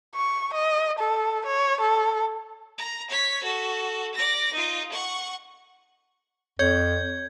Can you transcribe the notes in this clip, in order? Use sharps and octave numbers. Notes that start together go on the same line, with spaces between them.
C#6
D#5
A4
C#5
A4
A#5
C#5 B6
F#4 A4
D5 A#6
D#4 F4
F#5 C#6
F2 C#5 G6 G#6